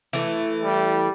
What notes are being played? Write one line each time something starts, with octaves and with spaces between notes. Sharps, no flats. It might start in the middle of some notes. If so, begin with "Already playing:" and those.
E3 A3
G3